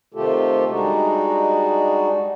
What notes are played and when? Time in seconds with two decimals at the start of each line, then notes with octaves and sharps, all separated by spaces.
0.14 C3 D#3 A3 F4 G4 A4
0.71 G3 G#3 D4 D#4 F#4